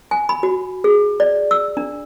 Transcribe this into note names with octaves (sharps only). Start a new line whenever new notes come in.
G#5
B5
F#4
G#4
D5
E6
D4